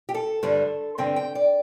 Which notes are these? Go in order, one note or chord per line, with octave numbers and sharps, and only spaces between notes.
G4
A4
G2 D3 G3 D4
G2 D3 C4 G5
G5
D5